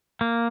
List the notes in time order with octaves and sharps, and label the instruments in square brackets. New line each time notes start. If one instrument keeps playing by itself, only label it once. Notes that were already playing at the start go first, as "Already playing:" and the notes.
[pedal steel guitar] A#3